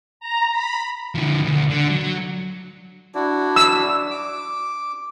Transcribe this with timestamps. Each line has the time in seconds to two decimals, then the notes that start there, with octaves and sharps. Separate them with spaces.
0.20 A#5
0.51 B5
1.15 D3 F3
1.43 D2
1.70 D3
1.89 F#3
3.15 D4 E4 F#4
3.56 E6
4.11 D6